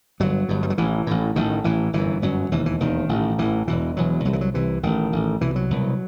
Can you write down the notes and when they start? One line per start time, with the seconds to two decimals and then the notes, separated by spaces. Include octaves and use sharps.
0.20 G1 G2 F#3
0.49 G1 G2
0.63 G3
0.70 F#3
0.78 A1 A2 E3
1.07 A1 A2
1.36 A1 A2 D#3
1.64 A1 A2 E3
1.93 G1 F#2 E3
2.22 G1 F#2 F#3
2.52 E1 D#2 E3
2.66 E3
2.80 E1 D#2 D#3
3.09 A1 A2
3.38 A1 A2 E3
3.67 E1 E2 B2 E3
3.96 E1 E2 B2 F#3
4.25 C2 C3 F#3
4.33 E3
4.41 F#3
4.54 C2 C3 E3
4.83 A1 A2 D#3
5.12 A1 A2
5.41 C2 B2 E3
5.56 F#3
5.70 C2 B2